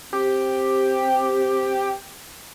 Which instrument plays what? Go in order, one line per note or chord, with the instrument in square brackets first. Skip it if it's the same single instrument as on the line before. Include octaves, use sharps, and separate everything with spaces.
[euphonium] C4 [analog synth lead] G4